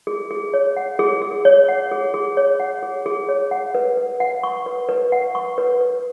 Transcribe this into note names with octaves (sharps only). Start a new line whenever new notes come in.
G#4
G#4
C#5
F#5
G#4
G#4
C#5
F#5
G#4
G#4
C#5
F#5
G#4
G#4
C#5
F#5
B4
B4
F#5
C#6
B4
B4
F#5
C#6
B4
B4